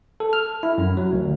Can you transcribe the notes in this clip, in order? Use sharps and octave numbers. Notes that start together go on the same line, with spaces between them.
A4
F6
E4
F#2
F#3
D2